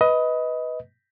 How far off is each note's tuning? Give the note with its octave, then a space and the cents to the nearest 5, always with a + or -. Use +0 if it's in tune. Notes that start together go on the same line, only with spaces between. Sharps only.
B4 +0 D#5 +20